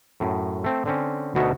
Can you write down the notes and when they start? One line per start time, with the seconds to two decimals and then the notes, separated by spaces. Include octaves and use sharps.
0.20 F#2 A2
0.64 A3 C4
0.85 D3 C4 C#4
1.35 D2 B2 D#4 F#4 C#5 E5